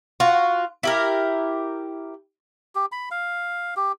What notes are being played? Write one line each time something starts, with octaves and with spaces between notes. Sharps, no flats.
F4 F#4
E4 G4 A#4
G4
B5
F5
G4